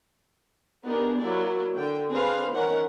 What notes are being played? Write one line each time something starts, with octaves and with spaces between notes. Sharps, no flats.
B3 D4 D#4 G4 G#4 A#4
F#3 A#3 E4 D5
D3 G5
C4 D4 G#4 B4 C5 F5
D#3 E3 C#4 A#4 F#5